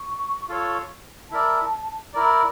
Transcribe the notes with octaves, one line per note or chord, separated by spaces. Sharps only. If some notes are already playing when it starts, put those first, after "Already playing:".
Already playing: C#6
F4 A4 C#5
E4 A#4 D5 A5
E4 A#4 D5 A#5